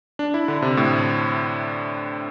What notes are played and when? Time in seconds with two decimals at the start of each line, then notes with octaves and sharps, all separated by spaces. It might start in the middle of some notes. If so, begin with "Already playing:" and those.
0.19 D4
0.34 E4
0.48 D3
0.62 C3
0.77 A2